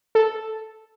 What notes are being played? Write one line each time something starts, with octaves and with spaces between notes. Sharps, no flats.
A4